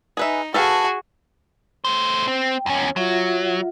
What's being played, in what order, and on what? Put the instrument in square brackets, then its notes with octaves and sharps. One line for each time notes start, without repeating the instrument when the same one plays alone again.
[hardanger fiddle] D#4 [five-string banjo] G#4 B4 E5
[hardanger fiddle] F#4 G#4 [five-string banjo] A4 B4 F5
[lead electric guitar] A3 C5
[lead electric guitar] C4 [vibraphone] G5
[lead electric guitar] E2 C#4
[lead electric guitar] F#3 [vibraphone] F4 E5 F#5